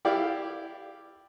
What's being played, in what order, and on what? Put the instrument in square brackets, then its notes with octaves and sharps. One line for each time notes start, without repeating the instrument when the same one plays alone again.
[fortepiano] E4 G4 D5 F5